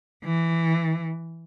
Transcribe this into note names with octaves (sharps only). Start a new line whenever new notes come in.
E3